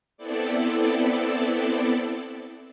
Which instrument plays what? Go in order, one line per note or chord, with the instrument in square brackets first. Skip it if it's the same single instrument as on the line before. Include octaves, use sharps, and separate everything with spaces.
[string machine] B3 C4 E4 A4 D5